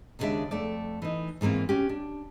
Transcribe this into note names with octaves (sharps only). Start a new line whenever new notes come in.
D#2 C#3 E3 G#3 D4 E5
F2 A3 D5
E3 D#4
G#2 E3 A#3 C4 F4
C#4 F#4 G4
D4